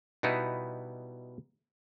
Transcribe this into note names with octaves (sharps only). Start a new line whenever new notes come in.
B2 G3 B3 D#4 E4